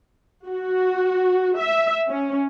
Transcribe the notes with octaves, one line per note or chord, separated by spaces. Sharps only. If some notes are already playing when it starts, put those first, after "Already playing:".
F#4
E5
C#4